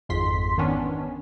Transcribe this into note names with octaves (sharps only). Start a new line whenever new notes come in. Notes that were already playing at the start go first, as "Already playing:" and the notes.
G#1 F2 G#2 C6 B6
D#3 B3 C#4 D4